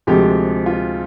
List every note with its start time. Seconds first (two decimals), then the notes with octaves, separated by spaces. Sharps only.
0.07 D2 C3 F3 G#3 G4
0.66 F4